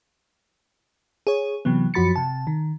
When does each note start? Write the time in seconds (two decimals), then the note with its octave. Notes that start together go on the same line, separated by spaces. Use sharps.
1.27 G#4 C#5
1.65 C3 E3 F#3 B3
1.94 F#2 F3 F#4 B5 A6 C#7
2.16 C3 A5
2.47 D#3